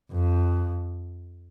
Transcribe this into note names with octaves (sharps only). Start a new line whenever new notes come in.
F2